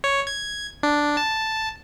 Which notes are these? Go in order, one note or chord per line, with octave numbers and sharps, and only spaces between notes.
C#5
G#6
D4
A5